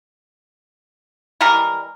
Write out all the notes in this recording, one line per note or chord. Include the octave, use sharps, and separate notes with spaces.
E3 G3 G#3 A#4